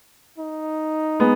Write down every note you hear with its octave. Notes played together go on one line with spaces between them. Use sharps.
D#4
G#3 B3